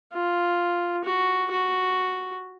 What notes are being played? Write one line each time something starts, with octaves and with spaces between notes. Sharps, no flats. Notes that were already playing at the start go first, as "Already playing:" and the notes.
F4
F#4
F#4